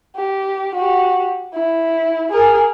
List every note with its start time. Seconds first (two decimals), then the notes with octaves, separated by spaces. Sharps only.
0.16 G4
0.75 F#4 G4
1.54 E4
2.32 G#4 A#4